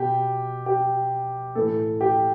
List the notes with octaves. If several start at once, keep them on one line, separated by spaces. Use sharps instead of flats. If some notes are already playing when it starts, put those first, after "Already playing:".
Already playing: B2 G4
G4
A2 E3 A4
G4